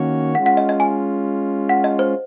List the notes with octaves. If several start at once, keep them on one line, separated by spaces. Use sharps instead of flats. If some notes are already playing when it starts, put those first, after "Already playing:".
Already playing: D#3 A#3 C#4 F#4 C#5
G#3 C#4 F4 F#5
F#5
D#5
D#5
G#5
F#5
D#5
C5